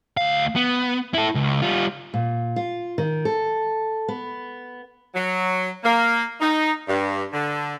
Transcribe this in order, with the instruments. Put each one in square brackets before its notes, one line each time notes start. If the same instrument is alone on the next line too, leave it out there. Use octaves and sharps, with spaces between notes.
[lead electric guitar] D2 F5
B3
E4 A4
C#2
G3 F4
[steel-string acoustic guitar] A#2
F4
D#3
A4
B3
[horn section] F#3
A#3
D#4
G2
D3